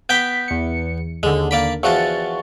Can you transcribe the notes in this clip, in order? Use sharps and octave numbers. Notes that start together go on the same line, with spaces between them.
B3 G5 G6 B6
E2 C#7
D#2 D3 G#3
A#3 D5 B5
E2 F3 F#4 C#6 A6